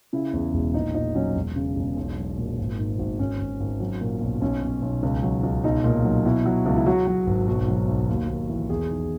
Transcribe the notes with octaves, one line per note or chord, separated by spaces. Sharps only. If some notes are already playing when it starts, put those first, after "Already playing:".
C#3 E4
E2
E1
A#1 D#4
A#1 D#4
F#3 C#4
E1
C#3
E1
B1
F#3
A#2
G#1
G#2
G#1
G#1 C#4
G#1
G#1
F#3
A#2
B1
B1 C#4
B1
B1
C#2
F#3
C#2
B1 D#4
A#2
F#3
B2 E4
F#3
C#2
E4
F#3 F#4
F#3
G#1
B1 F#4
F#3
B1
D#2
D#2
E3
E2 G#4
D#3